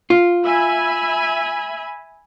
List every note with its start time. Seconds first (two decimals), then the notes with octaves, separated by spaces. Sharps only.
0.10 F4
0.45 E5 G#5 B5